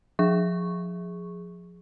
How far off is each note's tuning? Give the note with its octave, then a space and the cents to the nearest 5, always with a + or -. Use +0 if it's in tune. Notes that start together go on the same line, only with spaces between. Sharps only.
F3 +30 G#4 +0 C#6 -5